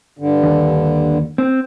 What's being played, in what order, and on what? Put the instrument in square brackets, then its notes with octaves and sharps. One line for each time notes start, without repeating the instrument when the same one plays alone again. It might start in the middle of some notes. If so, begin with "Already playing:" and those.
[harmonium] G2 D3
[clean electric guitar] D#2
C4